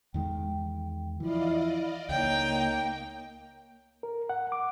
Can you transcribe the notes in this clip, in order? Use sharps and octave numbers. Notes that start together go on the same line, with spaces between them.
E2 D#3 G#3 G5
E3 F3 E4 D5 D#5 F5
C#2 A#3 D#4 C#5 G5
A#4
F#5
D6